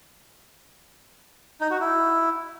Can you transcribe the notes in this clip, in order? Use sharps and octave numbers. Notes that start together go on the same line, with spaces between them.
D#4
F#4
E4